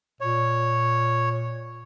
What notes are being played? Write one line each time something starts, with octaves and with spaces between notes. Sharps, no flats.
A#2 C#5